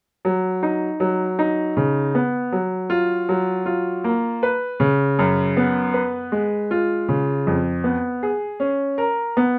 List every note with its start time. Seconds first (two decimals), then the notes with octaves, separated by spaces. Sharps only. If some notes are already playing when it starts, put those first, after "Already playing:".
0.25 F#3
0.63 D#4
1.00 F#3
1.39 D#4
1.77 C#3
2.15 B3
2.52 F#3
2.90 F4
3.29 F#3
3.66 F4
4.04 A#3
4.43 B4
4.80 C#3
5.19 F#2
5.57 B3
5.94 B4
6.32 G#3
6.71 F4
7.09 C#3
7.47 F2
7.84 B3
8.23 G#4
8.60 C#4
8.98 A#4
9.37 B3